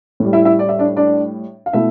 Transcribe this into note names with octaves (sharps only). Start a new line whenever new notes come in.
A2 G3
E4 E5
E4 E5
D5
E5
D4 D5
D4 D5
F5
B2 A3 E4 E5